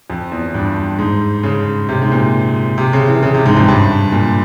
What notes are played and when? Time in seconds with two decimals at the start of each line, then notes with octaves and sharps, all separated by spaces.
0.10 F2
0.32 E2
0.54 G2
0.99 G#2
1.43 C#3
1.89 C3
2.02 G#2
2.12 A#2
2.78 C3
2.93 C#3
3.08 E3
3.23 C#3
3.34 C3
3.46 G#2
3.57 F2
3.68 G2
4.12 A#2